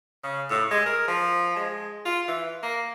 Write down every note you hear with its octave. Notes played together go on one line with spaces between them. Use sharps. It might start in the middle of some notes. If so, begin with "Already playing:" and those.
C#3
A2
G#3
A#4
F3
G#3
F4
E3
A#3